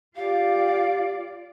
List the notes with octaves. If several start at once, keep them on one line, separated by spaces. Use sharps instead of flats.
F4 G4 D5 F5